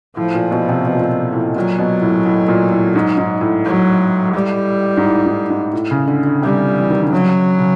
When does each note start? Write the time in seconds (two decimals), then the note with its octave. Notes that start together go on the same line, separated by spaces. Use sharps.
0.16 A2 F3
0.34 A#2
0.51 B2
0.69 C3
0.87 B2
0.93 A#2
1.01 B2
1.33 A2
1.56 A#2 F#3
1.78 B2
2.02 A2
2.26 A2
2.48 A#2
2.72 A2
2.96 G#2
3.18 G#2
3.41 A2
3.65 F#3
4.34 G3
4.97 G#2
5.04 A2
5.26 G#2
5.50 G#2
5.73 A2
5.91 C#3
6.07 D3
6.26 D3
6.42 C3 G3
6.78 E3
6.90 D#3
7.01 D3
7.12 C#3 F#3
7.59 C#3